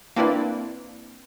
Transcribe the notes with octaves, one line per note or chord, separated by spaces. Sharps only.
A#3 C4 D4 E4 B4 D5